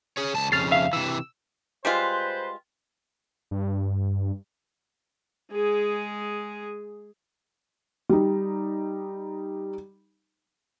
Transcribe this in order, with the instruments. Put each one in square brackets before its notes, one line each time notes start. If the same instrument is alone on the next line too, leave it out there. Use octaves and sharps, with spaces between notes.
[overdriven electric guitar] G#4 C#5
C#2 A5
[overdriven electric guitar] F2 C#3 [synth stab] F6 A6 C7
[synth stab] E5 F5
[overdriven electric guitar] C3 E3 [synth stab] E6
[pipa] G3 G#3 F4 [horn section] B4 C5
[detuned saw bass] G2
[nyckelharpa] G#3 G#4
[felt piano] G3 D#4